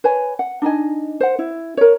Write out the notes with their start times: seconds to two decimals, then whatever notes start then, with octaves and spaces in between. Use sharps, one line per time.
0.04 B4 C#5 G#5
0.39 F#5
0.62 D4 D#4 D#5 G#5
1.20 C5 F#5
1.39 E4
1.77 A#4 C#5